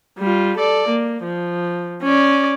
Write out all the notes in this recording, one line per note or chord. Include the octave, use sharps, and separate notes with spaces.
G3 F4
A4 D5
A#3
F3
C#4 D5